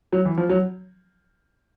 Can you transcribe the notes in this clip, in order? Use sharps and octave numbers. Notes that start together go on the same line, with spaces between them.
F#3
E3
F3
F#3